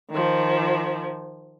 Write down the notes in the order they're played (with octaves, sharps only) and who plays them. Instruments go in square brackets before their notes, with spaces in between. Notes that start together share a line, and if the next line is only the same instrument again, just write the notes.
[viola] D#3 F3